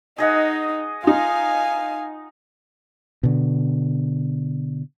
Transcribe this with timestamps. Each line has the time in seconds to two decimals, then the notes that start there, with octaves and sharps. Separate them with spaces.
0.18 D#4 G#4 D#5 F#5
1.04 D#4 F4 F5 G#5
3.23 B2 D3